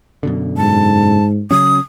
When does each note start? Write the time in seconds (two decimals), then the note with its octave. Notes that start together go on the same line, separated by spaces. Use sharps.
0.23 F#2 B2 D3
0.57 G#2 A5
1.51 C#3 F#3 C#4 D#6